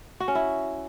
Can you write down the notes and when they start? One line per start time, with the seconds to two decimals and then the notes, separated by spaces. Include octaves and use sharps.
0.20 F#4
0.28 C#4
0.35 E4